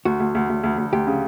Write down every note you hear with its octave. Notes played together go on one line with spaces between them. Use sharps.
D2 F#4
D2
D2
D2
D2
D2
D2 G4
C#3